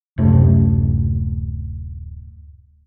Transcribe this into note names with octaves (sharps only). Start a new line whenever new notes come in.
D1 F#2 C3 A3